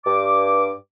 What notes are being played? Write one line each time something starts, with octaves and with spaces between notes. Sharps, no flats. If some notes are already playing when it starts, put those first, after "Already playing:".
G2 D6